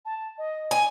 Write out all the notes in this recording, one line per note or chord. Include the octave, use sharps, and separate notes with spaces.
A5
D#5
G#5